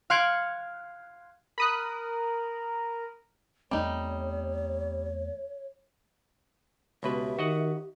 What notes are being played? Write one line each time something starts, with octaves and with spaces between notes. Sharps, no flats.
F5 C6 F#6 G#6 C#7 D7
A#4 B5 D#6 F#6
E2 G3 A3 C4 D#4 C#5
C#2 B2 G4 B4 E5
D#3 F#4 D#5 F#5